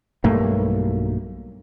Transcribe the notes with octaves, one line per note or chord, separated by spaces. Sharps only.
B1 G2 A3 A#3